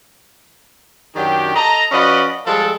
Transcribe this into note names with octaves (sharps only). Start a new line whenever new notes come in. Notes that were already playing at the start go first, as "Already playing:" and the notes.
F#2 D#3 F#3 D4 G4 G5
A4 D#5 A5 A#5
F3 C#4 F#4 B4 D5 D#5
F3 G3 G#3 A4